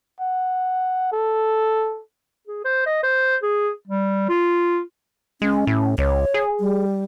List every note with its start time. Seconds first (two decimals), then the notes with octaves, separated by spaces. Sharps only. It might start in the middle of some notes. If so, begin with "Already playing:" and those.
0.20 F#5
1.12 A4
2.47 G#4
2.65 C5
2.86 D#5
3.03 C5
3.43 G#4
3.87 G3
4.29 F4
5.42 G#3 C#4
5.67 A2
5.98 C#2 C#5
6.34 G#4
6.60 G3